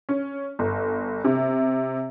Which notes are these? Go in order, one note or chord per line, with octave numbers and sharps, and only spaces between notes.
C#4
G1
C3